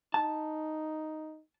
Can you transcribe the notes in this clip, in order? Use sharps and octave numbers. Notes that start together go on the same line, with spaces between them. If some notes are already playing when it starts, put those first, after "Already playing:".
D#4 A5